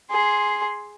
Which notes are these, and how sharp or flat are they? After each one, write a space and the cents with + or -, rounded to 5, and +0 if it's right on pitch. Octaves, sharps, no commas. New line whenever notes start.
G#4 +0 C6 +0